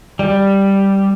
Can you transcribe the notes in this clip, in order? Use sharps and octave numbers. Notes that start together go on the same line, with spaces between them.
G3